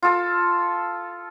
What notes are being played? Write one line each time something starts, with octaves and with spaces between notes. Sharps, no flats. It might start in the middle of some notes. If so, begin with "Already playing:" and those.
F4 A4